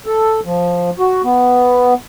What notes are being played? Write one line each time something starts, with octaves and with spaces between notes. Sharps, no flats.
A4
F3
F#4
B3